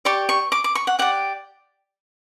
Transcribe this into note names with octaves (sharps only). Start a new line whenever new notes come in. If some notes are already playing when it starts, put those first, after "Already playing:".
G4 D5 C#6
C#6
D6
D6
C#6
F#5
G4 D5 F#5